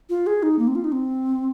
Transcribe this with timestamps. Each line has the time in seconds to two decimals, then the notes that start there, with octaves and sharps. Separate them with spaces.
0.09 F4
0.26 G#4
0.43 D#4
0.59 A#3
0.67 C4
0.75 F4
0.84 D#4
0.92 C4